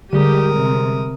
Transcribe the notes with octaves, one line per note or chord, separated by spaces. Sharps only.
D3 G3 G#3 G4 A#4 D#6
C3